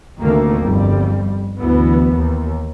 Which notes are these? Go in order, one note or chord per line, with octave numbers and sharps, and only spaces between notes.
D2 C3 D#3 A3 A#3
G1 F2 G3
D2 E3 B3
D#2